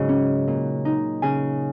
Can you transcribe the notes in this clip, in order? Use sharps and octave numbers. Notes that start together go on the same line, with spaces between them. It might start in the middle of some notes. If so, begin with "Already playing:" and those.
Already playing: G#2 C#3 F#3
C#4
A#2
D#4
C#3 G#5